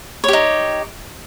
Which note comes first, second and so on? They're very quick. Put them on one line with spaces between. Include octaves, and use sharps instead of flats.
C#5 G4 D#4